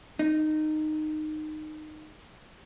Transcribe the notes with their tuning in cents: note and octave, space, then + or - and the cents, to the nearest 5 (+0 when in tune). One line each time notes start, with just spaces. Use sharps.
D#4 -15